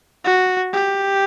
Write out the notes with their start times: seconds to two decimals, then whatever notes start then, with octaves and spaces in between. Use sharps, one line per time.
0.25 F#4
0.73 G4